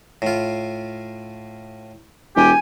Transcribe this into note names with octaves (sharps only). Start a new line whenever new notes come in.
A2 F4
E1 G4 G#5